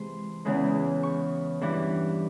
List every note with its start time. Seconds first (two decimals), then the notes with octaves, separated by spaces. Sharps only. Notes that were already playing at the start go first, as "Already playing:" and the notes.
Already playing: C3 E3 G#3 C6
0.45 E2 C#3 E3 G#3
1.03 C#6
1.61 G2 E3 G3